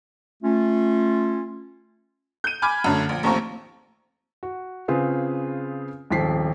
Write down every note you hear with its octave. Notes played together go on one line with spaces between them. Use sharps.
A3 C#4 F4
G6 D#7
G#5 B5 D6 F6 G#6
F#2 D3 A3
A#1
A#1 D#2 A3 C4 A#5 C#6
F#4
C#3 C4 F4 G#4 B4
D#1 G#1 F3 B6 C7